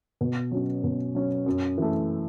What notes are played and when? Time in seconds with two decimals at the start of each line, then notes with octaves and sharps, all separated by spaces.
0.21 B2
0.52 F#3 C#4
0.84 B2
1.15 F#3 C#4
1.46 F#2
1.78 E3 A3